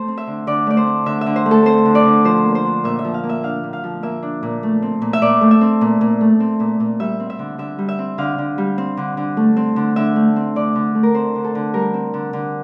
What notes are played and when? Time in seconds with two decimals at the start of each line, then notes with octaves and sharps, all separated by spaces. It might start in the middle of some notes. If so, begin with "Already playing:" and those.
Already playing: A3 C5
0.08 C4
0.18 E5
0.27 D3
0.47 D3 D5
0.67 A3 D5
0.77 C5
0.86 C4
1.06 D3 E5
1.21 E5
1.26 D3
1.36 C5
1.46 A3
1.51 A4
1.66 C4 C5
1.85 D3
1.95 D5
2.05 D3
2.25 F3 C5
2.45 A#3
2.55 C5
2.64 D4
2.84 A#2 E5
2.99 E5
3.04 F3
3.14 F5
3.23 A#3
3.29 E5
3.43 D4 F5
3.63 A#2
3.73 F5
3.84 F3
4.03 A#3 E5
4.23 D4
4.43 A#2
4.63 A3
4.82 C4
5.02 A#2
5.13 E5
5.22 A#2 D5
5.41 A3
5.51 E5
5.61 C4
5.81 A#2
6.01 A#2
6.21 A3
6.40 C4
6.60 A#2
6.80 A#2
7.00 G3 E5
7.20 C4
7.30 E5
7.39 D3
7.58 D3 E5
7.78 G3
7.89 E5
7.99 C4
8.18 D3 F5
8.38 D3
8.58 G3
8.78 C4
8.97 D3
9.17 D3
9.37 A3
9.56 C4
9.76 D3
9.96 D3 E5
10.16 A3
10.36 C4
10.56 D3 D5
10.75 D3
10.95 A3
11.03 A#4
11.14 C4 C5
11.35 D3
11.44 A4
11.55 D3
11.74 G3 A#4
11.94 C4
12.14 D3
12.33 D3